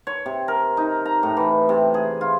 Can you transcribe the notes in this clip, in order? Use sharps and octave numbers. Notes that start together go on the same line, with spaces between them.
C#5
C3
A#4
D#4
A#5
A2
E3
C3
G#4
F4